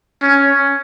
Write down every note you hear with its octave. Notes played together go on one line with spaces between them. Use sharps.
C#4